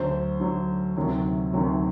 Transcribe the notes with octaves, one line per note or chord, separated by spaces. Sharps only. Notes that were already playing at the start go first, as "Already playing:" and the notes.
Already playing: D2 D3 F#3 C5
D2 D3 F#3
D2 C3 D#3 F#3
D2 C3 D#3 F#3